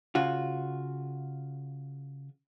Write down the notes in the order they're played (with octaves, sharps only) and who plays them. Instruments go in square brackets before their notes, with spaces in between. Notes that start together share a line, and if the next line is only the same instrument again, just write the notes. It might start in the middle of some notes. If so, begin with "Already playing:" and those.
[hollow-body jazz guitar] C#3 F4 F#4